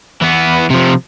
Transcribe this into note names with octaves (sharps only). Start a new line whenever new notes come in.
E3 B3
C3 F3